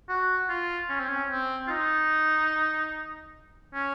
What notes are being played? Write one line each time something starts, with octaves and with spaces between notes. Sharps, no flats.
F#4
F4
C#4
C4
C#4
C4
F4
D#4
C#4